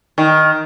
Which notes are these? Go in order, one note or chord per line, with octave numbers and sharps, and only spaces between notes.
D#3